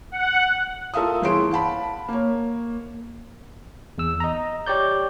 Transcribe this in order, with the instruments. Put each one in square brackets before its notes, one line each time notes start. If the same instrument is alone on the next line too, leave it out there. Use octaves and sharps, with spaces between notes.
[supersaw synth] F#5
[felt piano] F4 A4 A#4 E5 F5 D#6
G1 E3 E4 G#4 C6 D7
F5 F#5 A5 B5
A#3 C#5
[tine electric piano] E2 E6
D#5 A#5
G4 C#5 D5 G6